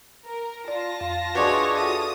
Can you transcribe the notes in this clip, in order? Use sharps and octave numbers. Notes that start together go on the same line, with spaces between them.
A#4
F4 D5 A5 A#6
F2 F5
G#3 D4 F#4 B4 C#5
F#4 A4 E5 D#6